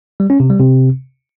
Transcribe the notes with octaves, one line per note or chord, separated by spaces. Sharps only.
G3
C#4
C3
G3
C3